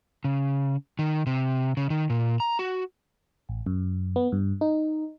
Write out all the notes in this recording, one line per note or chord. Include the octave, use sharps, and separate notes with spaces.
C#3
D#3
C3
C#3
D#3
A#2
A#5
F#4
A1
F#2
B3
G2
D#4